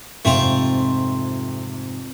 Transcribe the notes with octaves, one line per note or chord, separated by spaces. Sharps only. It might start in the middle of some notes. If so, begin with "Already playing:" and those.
F2 G#2 C3 A3 C4 F4